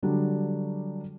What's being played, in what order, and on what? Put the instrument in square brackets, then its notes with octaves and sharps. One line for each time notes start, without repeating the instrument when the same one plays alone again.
[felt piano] D3 F#3 G3 D4